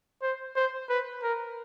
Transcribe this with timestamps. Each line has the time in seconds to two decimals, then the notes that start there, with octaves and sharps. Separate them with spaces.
0.22 C5
0.56 C5
0.89 B4
1.23 A#4